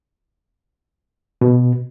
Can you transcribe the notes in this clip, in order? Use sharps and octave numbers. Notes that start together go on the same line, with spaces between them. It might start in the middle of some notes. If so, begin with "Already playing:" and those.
B2